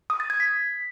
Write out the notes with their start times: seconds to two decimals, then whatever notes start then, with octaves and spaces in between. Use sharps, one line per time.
0.10 D#6
0.20 A6
0.30 G#6
0.40 B6